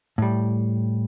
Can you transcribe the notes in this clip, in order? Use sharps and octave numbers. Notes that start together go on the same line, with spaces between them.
A2 G3